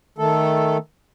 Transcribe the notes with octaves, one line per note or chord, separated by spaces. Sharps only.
D#3 A3 A4